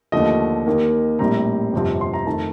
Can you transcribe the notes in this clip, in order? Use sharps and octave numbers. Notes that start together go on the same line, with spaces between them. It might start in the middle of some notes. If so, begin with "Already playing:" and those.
D#2 D3 F3 A3 D#5
D#2 D#3 A#3
A#1 A2 G3 C4 A#5
G1 F2 C3 F3 C4
C6
A#5
F2 D#3 A3 C4 A5